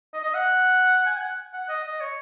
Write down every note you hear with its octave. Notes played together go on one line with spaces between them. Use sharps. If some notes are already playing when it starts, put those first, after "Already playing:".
D#5
D#5
F#5
G#5
F#5
F#5
D#5
D#5
C#5